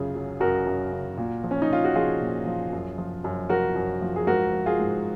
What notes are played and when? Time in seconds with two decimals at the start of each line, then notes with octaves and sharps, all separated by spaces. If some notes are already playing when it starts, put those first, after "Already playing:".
Already playing: F#2 C#3 F4 G#4
0.15 F#3
0.40 F#2 F#4 A#4
0.67 F#2
0.92 C#3
1.17 A#2
1.44 F3
1.51 C#4
1.62 D#4
1.69 A#2 F4
1.84 F#4
1.95 F3 F4 G#4
2.21 A#2
2.47 F3
2.73 F#2
2.98 F3
3.24 F#2
3.49 F3 F#4 A#4
3.76 F#2
4.02 F3
4.16 G#4
4.27 G#2 F#4 A#4
4.53 F3
4.66 F4 G#4
4.79 G#2